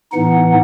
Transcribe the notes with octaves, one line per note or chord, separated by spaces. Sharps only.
A2 E3 B3 D#4 F#5